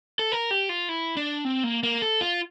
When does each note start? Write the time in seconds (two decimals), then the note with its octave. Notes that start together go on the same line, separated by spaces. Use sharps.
0.19 A4
0.32 A#4
0.51 G4
0.69 F4
0.89 E4
1.17 D4
1.45 C4
1.64 A#3
1.83 A#3
2.02 A4
2.21 F4